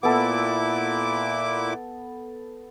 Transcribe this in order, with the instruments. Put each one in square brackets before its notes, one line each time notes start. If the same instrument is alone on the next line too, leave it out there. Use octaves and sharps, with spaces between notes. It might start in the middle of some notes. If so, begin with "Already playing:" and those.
[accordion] A#2 E4 D6 [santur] B3 A4